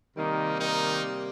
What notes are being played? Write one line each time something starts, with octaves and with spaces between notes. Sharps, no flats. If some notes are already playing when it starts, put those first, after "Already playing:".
C3 D#3 G3 A#3 D#4
D#3 D#4